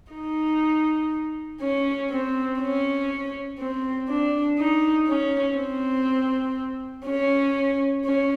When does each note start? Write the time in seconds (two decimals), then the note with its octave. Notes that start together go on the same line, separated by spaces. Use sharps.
0.12 D#4
1.61 C#4
2.10 C4
2.60 C#4
3.59 C4
4.08 D4
4.58 D#4
5.08 C#4
5.57 C4
7.06 C#4
8.05 C#4